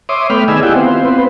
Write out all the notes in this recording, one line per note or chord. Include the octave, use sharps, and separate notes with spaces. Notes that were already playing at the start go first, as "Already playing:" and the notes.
C#5 E5 C6 D6 D#6
A3 B3 G5 B5 F6
D#3 G#4 D5 D#5 G#5 E6
E4 F4 G4 F#5 G5
B3 C4 F4 C5
B3 C4 B4 C5